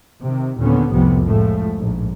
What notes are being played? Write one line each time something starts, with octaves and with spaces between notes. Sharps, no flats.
C3 D#3
D#2 A#2 D3 B3 C#4
F1 C2 F2 A2 C3 B3
A2 F3 G#3 A3
A#1 G#2